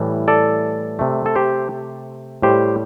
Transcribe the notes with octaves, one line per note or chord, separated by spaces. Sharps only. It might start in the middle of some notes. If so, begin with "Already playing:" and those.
Already playing: A2 E3 G3
A4 D5
C3 A3
A4
G4 C5
A2 G3 G4 C5